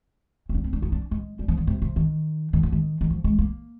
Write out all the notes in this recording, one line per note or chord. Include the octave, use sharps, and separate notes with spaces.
C4
D4
C4
D4
D#4
D4
G#3
G3
F3
D3
C3
C3
D#3
D#3
F3
D#3
D#3
F3
G#3
A#3